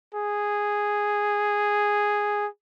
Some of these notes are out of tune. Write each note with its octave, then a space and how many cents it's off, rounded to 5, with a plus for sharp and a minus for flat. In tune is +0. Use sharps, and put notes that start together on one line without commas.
G#4 -5